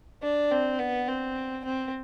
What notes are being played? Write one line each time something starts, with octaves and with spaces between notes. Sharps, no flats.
D4
C4
B3
C4
C4